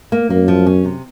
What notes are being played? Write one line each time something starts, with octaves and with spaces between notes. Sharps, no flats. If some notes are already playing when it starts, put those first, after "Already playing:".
A#3
F#2 A#3
F3
C#4
C3